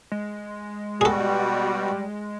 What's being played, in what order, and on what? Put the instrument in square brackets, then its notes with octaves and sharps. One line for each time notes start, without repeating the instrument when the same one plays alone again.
[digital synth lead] G#3
[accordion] B2 F#4 [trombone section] G3 [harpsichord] G#4 A4